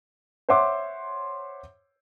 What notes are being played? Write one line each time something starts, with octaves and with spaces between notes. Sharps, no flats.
C5 C#5 E5 F#5 C6 D6